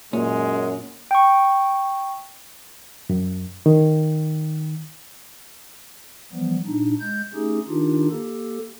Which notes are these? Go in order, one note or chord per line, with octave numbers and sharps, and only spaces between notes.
F#2 A#2 G#3 C#4
G5 C#6
F#2
D#3
E3 F3 G3 B3
A#2 D4 D#4
G#3 G6
A3 C#4 D#4 G4 G#4
D#3 D4 D#4 F4 G4
A#3 G4 A4